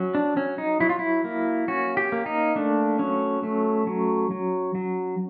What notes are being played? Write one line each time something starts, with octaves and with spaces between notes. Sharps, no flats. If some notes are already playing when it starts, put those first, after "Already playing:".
Already playing: F#3 C#4
D4
F#3 C#4
D#4
F#3 E4
F4
E4
A#3
C#4 F#4
G4
A#3
D#4
A3 D4
F#3 C#4
A3
F#3
F#3
F#3